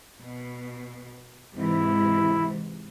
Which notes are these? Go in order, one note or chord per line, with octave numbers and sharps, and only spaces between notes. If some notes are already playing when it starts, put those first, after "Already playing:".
B2
G#2 C3 E3 E4